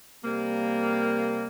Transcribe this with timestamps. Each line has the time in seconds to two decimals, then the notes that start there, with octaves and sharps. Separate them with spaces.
0.24 C3 G3 A#3